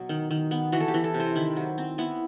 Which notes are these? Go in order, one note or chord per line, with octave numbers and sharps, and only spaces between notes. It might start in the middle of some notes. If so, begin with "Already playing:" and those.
Already playing: B2 F#3
D#3
D#3
B3
E3 F#4
A4
G4
E3
A4
C3
C5
D#3 E4
F#3
C4
B3 E4